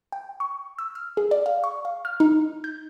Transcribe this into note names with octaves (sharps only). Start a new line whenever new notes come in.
G5
C#6
E6
F6
G#4
D5
F5
C#6
F5
F6
D#4
G6